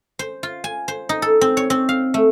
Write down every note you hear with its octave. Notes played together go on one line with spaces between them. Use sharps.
C5
F4
G#5
C5
D#4
A4
C4
C#5
C4
F5
A3